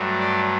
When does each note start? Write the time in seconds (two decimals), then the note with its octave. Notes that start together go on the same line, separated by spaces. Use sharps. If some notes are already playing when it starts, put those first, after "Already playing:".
Already playing: G2 F#3 A3
0.20 D5